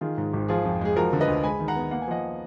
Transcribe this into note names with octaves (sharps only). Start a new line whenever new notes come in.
D#3 F4 G#4
G#2
G#1
F3 F4 G#4
F2
G#3 G#4
F3 F#4 A#4
D3
B4 D#5
D2
G#3 G#5 B5
D#3
F#5 A#5
B3
A#3 F#5
G#5
F3 D#5 F#5